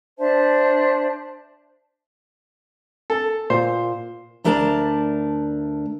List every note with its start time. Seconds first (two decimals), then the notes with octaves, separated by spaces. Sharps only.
0.18 D4 C5 E5 A5
3.10 A4
3.50 A#2 C5
4.44 D2 A3 D4 A#4 G#5 A5